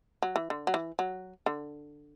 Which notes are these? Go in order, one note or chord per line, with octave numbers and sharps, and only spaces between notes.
F#3
E3
D3
F#3
E3
F#3
D3